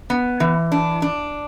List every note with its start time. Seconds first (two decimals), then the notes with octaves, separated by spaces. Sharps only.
0.10 B3
0.40 E3
0.72 D4
1.02 D4